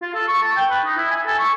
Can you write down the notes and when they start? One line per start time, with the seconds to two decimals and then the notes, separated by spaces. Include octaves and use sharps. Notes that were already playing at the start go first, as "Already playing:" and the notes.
0.02 F4
0.14 A4
0.28 C#6
0.41 A5
0.56 G5
0.70 B4
0.85 D#4
0.97 E4
1.11 G#5
1.26 A4
1.39 C#6